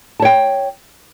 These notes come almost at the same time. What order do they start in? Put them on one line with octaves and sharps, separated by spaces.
A5 C#5 G5